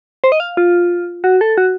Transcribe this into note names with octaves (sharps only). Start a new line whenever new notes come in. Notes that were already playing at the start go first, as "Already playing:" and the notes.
C5
D#5
F5
F4
F#4
A4
F#4